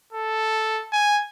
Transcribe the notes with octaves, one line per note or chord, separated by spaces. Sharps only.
A4
G#5